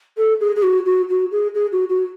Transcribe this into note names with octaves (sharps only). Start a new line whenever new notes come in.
A4
G#4
G#4
F#4
F#4
F#4
G#4
G#4
F#4
F#4